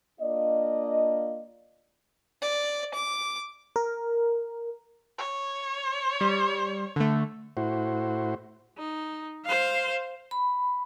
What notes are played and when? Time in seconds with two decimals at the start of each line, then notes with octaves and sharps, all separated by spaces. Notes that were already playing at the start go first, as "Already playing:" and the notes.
0.21 A#3 D4 F4 D5 D#5
2.42 D5
2.94 D6
3.76 A#4
5.18 C#5
6.21 G3
6.96 D3 A3
7.57 A2 E4 F#4 C5
8.78 D#4
9.46 C5 F5
10.31 B5